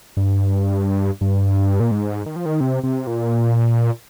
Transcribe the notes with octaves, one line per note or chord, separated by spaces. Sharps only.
G2
G2
A#2
G#2
D#3
F3
D#3
C3
C3
A#2